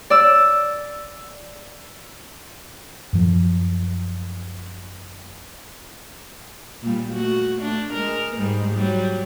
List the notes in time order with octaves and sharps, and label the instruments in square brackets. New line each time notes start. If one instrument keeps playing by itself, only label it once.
[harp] D5 E6
[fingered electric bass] F#2 F3
[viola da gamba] A#2 G3
A3 F#4
A3 D4
G#3 A#4
G#2 G3
F#3 G3